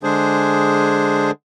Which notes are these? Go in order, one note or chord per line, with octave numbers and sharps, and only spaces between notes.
D3 G#3 D4 G#4 C5